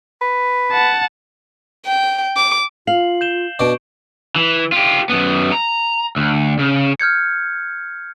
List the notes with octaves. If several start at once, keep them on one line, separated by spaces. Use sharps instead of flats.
B4
F#5 A5
G5
D6
F4 F5 C7 F#7
G6 E7 G7
B2 D4 C#6 D7
E3
F4 G4
F#2 B3
A#5
D2
C#3
F6 G6 G#6 C#7